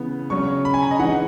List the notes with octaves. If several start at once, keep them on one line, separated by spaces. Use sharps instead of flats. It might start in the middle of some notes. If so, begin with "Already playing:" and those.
Already playing: C#3 E3 B3
C#3 F#3 C#4 C#6
B5
G#5
A#5
D#5
E3 G#3 D#4 F#5